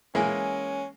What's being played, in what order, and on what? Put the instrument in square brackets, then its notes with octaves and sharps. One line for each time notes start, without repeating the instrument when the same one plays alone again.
[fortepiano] E3 G#3 A#3 [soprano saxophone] C#4